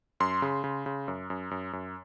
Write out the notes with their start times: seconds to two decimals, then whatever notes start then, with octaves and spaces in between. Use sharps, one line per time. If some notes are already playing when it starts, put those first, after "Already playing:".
0.20 F#2 C6
0.42 C#3
0.64 C#3
0.86 C#3
1.08 F#2
1.30 F#2
1.51 F#2
1.73 F#2